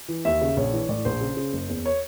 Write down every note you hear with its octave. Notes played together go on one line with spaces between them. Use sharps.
E3
D#2 E5
C#3
A#1 C#5
E3
A2 D5
A#1 C5
C#3
C#3
F#1
E2
C#5